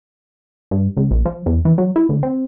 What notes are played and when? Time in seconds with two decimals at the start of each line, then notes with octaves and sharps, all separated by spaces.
0.71 G2
0.97 C#2
1.11 A#1
1.25 F3
1.46 E2
1.65 E3
1.78 F#3
1.96 E4
2.09 D2
2.23 C4